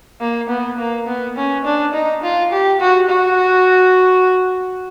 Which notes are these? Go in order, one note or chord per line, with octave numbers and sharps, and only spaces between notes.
A#3
B3
A#3
B3
C#4
D4
D#4
F4
G4
F#4
F#4